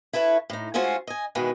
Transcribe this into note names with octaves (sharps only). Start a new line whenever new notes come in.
E4 A4 B4 C#5
A2 D#4
G#3 A3 C#4 F4 F#4 C5
D#5 G#5
B2 D#3 E3 G#3 B3